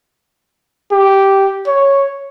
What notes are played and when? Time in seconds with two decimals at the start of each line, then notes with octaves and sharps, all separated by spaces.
0.92 G4
1.67 C#5